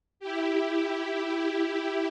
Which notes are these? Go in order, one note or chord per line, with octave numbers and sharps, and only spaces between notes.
E4 G4